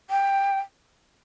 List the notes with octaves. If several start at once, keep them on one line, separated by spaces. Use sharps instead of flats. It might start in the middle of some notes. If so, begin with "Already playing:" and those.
G5